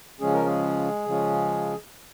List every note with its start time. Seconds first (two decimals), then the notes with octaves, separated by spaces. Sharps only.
0.21 C#3 F3 G#3 C#4 G#4
0.34 A#4
0.45 G#3 G#4
1.06 C#3 F3 G#3 C#4